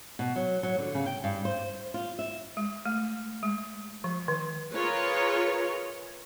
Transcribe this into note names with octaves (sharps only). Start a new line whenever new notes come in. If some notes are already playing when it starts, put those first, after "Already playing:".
B2
F#3
F#3
D3
C#3
G5
G2
C5
F4
E5
G#3
A3
G#3
F3
D#3
F4 G#4 A#4 B4 C#5